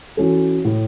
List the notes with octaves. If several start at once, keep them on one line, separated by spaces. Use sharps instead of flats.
E3 C#4 F#4 A4
A2